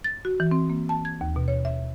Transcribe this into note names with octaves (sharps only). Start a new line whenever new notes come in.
A6
F#4
E3
C4
A#3
A5
G#6
D#2
B2
C#5
E5